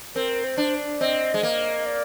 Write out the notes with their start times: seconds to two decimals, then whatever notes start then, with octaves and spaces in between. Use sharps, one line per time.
0.15 C4 A#4
0.44 C5
0.57 D4
1.00 C4 D#5
1.34 G#3
1.43 A#3
1.86 D5